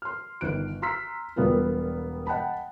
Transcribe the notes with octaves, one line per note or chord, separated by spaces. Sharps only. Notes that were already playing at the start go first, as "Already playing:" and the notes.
C6 F6
G1 D#3 F#6 D7
A#5 C6 E6 F6 B6
E1 G3 B3 F4 A#4
D#5 F#5 G5 A5 B5